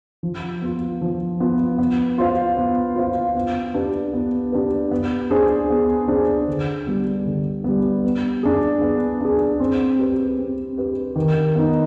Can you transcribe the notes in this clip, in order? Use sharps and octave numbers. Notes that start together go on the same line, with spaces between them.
F3
B3 F4
F3
B3 F4
B3
F4 C5 F5
B3
F4 C5 F5
B3
D4 G4 B4
B3
D4 G4 B4
B3
D4 G#4 C5
B3
D4 G#4 C5
D3
G3 B3
D3
G3 B3
B3
D4 G#4
B3
D4 G#4
C4
G4 B4
C4
G4 B4
D#3
B3 D#4